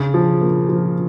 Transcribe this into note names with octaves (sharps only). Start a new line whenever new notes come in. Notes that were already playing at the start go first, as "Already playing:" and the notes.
Already playing: C#3
F3
A#3
F3